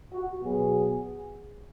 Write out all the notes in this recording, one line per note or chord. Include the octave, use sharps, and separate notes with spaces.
F#4
B2 F#3 B3 G#4